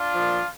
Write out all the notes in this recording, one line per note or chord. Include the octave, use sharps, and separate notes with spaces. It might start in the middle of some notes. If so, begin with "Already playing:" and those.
Already playing: D4 F4
A#2 F3